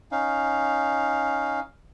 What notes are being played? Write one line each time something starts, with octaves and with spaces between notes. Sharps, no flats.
C#4 D#4 F5